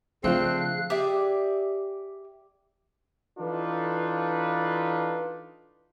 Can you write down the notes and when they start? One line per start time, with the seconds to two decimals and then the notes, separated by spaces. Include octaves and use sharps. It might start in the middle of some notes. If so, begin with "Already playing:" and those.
0.24 C#3 F3 A3 C4 D4 F4 F5 F#6
0.90 G4 G#4 D5 E5
3.39 E3 D4 D#4 F4 A4 B4